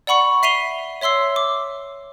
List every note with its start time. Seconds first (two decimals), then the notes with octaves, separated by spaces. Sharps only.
0.07 D5 F#5 B5 C#6 C#7
0.43 E5 B6 C7 D#7 F7 G7
1.01 C#5 E5 C6 E6 C7
1.36 D6